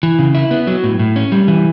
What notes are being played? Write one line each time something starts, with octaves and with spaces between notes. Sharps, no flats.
E3
C#3
E4
B3
F#3
A2
A2
C#4
G3
E3